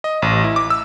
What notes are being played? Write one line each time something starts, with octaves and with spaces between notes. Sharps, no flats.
D#5
A1
E4
D6
E6